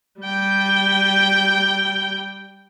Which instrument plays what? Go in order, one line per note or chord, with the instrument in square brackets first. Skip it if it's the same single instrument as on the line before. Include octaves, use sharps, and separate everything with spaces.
[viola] G3 G5